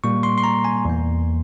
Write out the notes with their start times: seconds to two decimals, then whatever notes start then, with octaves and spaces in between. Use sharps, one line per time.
0.04 A#2 G3 A#3 C#6
0.23 C6
0.38 C6
0.44 A#5
0.65 G#5
0.85 E2 E3 A#3